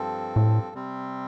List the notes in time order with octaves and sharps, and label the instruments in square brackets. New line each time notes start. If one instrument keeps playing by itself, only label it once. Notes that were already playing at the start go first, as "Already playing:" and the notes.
Already playing: [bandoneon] G2 F3 C4 A4
[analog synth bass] A2
[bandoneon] C3 G3 C4